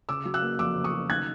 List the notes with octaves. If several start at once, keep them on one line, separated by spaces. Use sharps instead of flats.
C#3 D6 E6
F#3
E6 F#6
A#3
F2 D6 E6
C#3
C#6 D#6
F#3
D#3 F#6 G#6